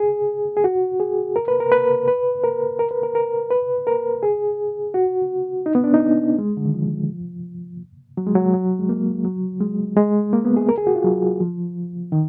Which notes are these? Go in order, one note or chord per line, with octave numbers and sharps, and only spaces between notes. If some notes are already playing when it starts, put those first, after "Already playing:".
Already playing: G#4
G#4
F#4
G#4
A#4
B4
A#4
B4
B4
A#4
A#4
B4
A#4
A#4
B4
A#4
G#4
F#4
D#4
B3
D4
D#4
G#3
D3
D#3
F3
F#3
G#3
F#3
F#3
G#3
A#3
F#3
G#3
G#3
A#3
B3
G#4
A#4
G#4
F#4
F4
F#3
F3
D#3